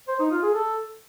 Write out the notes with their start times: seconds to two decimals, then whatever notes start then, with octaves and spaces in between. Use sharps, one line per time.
0.08 C5
0.19 D#4
0.31 F4
0.42 G#4
0.54 A4